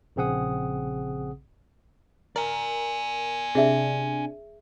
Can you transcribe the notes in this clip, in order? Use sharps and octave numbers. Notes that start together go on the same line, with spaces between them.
A#1 C#3 C4 G#4 F#5 D#6
A#4 D5 G#5
C3 D4 G#4 E5